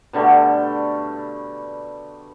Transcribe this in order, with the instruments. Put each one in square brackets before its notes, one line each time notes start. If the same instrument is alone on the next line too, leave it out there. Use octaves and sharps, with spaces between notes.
[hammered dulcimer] B2 D3 G3 A3